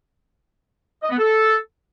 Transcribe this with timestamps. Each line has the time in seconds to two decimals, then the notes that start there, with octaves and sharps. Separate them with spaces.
1.03 D#5
1.11 B3
1.18 A4